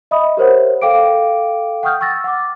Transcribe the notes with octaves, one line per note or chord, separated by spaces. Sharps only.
D#5 E5 B5 D#6
G4 A#4 C5 C#5 F#5
A4 F5 G5 D6 D7
F#5 G5 C#6 D#6 F6 G6
C#6 E6 A6 A#6
F#5 D6